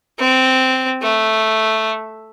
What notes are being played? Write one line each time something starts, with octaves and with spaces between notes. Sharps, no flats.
C4
A3